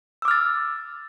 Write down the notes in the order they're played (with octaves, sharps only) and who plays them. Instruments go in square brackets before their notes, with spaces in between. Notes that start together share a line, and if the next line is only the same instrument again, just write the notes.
[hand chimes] E6
D6
F6
A6